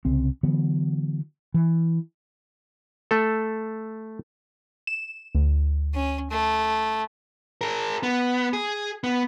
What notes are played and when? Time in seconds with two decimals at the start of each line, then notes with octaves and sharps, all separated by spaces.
0.05 C2 C#3 C4
0.43 D3 E3 F#3 B3
1.54 E3
3.11 A3 A4
4.87 E7
5.35 D2
5.94 C#4
6.31 A3
7.61 G#4 A#4
8.03 B3
8.53 G#4
9.04 B3